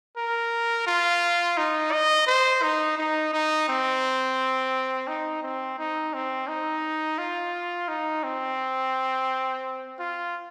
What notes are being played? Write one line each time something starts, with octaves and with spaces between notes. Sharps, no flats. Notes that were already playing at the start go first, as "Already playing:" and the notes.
A#4
F4
D#4
D#5
C5
D#4
D#4
D#4
C4
D#4
C4
D#4
C4
D#4
F4
D#4
C4
F4